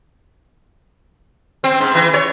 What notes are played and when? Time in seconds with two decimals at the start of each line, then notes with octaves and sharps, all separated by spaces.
1.64 C4
1.80 G#2
1.95 E3
2.14 C#5